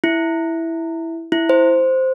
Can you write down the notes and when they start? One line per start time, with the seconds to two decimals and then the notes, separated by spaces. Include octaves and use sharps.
0.04 E4
1.32 E4
1.49 C5